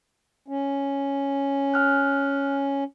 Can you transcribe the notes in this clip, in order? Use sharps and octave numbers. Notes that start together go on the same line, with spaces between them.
C#4
G#5 F6 F#6